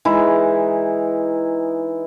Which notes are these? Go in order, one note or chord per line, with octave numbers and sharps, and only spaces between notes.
E3 G#3 D#4 E4